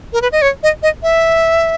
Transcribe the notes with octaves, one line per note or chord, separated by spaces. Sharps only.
A#4
B4
D#5
C#5
D#5
D#5
E5